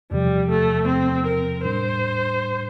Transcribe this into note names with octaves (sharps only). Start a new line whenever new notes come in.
E2 C3 F3 G3
A3
C4
A#4
A2 G3 D4 C5